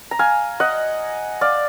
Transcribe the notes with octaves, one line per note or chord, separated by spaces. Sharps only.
A#5
F5 G#5
D#5 F#5
D5 F5